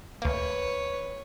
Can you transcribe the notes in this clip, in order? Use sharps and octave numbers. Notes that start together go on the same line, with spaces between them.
D2 A#3 B4 C#5